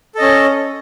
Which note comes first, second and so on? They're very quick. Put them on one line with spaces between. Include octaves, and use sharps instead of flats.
A4 D#5 C#4